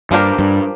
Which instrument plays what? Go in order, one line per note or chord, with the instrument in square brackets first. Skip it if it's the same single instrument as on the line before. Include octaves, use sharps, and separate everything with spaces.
[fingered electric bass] G2 [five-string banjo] F3 A#3 D4 G4 A#4
[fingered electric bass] G2